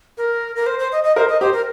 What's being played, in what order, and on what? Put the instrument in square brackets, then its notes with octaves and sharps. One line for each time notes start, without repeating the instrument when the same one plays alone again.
[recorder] A#4
A#4
C5
C5
D#5
D#5
[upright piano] A#4 [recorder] C5
[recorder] D#5
[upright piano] G4 [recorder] C5
[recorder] A#4